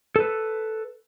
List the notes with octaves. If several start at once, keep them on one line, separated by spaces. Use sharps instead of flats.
A4 B4